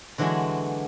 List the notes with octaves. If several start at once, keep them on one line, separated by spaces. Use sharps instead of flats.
D3 E3 F#3 G#3 D4 F#4